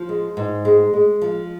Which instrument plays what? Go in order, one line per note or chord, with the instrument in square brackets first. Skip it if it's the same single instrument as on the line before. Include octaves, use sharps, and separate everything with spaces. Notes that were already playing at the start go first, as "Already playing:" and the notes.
Already playing: [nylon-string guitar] F3
G#3
G#2
G#3
G#3
F3